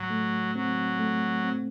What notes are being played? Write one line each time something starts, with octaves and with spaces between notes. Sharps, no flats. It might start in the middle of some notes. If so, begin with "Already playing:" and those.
Already playing: A2 F#3
A3
F#3 C4
A3
C4